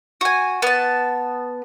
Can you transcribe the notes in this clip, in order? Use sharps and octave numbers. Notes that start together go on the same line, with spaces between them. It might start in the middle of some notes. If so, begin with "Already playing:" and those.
F#4 G#5
B3 A5